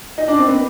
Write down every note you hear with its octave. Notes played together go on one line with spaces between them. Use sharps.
D#4
D4
C4
B3